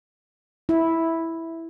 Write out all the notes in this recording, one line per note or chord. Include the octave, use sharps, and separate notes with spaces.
E4